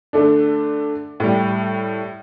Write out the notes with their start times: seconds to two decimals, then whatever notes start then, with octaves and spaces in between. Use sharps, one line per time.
0.13 D3 A3 D4
1.20 A2 G3